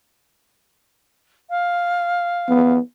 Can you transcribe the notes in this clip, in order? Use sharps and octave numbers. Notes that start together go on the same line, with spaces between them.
F5
B3